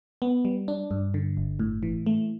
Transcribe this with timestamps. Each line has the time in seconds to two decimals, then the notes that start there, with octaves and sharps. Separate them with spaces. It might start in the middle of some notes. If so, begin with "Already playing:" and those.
0.22 B3
0.45 G3
0.68 D4
0.91 G2
1.14 D3
1.37 G1
1.59 A2
1.83 E3
2.06 A3